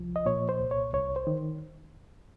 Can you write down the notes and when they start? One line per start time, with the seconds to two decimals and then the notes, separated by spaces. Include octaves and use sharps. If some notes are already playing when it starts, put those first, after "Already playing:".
Already playing: C2 F3
0.16 D#5
0.26 A#2 C#5
0.49 C5
0.60 C2
0.71 C#5
0.93 C2 C#5
1.16 C5
1.27 D#3